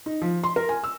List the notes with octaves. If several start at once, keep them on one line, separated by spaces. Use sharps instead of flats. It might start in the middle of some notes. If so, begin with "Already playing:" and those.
D#4
F3
C6
A#4
G#5
E6